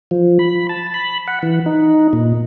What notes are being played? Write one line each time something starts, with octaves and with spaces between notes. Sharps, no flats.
F3
B5
A5
B5
F#5
E3
D#4
A#2